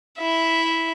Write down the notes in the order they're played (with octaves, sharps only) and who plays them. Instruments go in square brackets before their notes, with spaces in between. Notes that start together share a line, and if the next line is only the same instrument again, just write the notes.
[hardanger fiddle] E4 E5